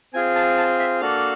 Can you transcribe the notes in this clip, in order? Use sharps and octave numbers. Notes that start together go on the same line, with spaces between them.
C4 F4 G#4 G#5
A5
A5
E5
A#3 D4 F#4 A4 F5